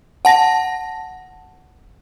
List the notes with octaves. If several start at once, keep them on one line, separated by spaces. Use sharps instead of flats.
F#5 A5 A#6